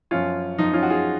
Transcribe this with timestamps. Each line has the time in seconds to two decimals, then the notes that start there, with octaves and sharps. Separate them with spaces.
0.11 F#2 F3 C#4 F4
0.58 F#2 F3 D#4
0.74 C#4 F4
0.83 F#4
0.90 F4 G#4